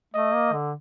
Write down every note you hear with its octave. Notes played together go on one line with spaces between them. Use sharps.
A3 D#5
A#3
D3